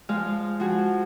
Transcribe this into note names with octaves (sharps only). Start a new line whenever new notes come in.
F3 G#3 F5
F3 F#4 G#4